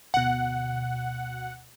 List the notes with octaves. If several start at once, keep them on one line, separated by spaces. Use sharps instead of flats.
D2 B2 F#5